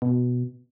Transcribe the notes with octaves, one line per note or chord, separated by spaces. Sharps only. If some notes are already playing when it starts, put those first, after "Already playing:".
B2